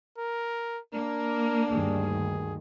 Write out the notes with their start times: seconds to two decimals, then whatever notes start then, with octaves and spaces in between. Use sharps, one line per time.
0.18 A#4
0.94 A#3 D4 A#4
1.71 D2 G2 D#3 G#4